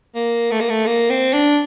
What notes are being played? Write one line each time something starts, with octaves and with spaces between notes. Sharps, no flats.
A#3
A3
A#3
A3
A#3
C4
D4